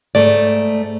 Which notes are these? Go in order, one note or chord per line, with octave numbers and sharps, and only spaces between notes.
G#2 A3 D5